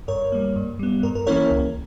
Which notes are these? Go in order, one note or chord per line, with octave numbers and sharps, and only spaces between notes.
G2 A#4 C#5
G3 A#3
G2
G3 B3
G2 A#4
A#4
E3 A#3 C#4 E4 A#4 C#5
C#2